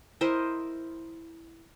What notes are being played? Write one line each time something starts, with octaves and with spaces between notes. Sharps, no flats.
E4 A#4 C5 D#5